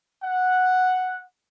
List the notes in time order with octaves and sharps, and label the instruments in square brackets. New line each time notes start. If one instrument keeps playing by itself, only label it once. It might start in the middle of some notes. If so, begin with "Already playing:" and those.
[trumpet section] F#5